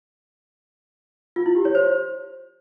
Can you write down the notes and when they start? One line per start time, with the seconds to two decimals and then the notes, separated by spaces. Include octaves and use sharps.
1.36 F4
1.46 E4
1.56 G4
1.65 C#5
1.75 C5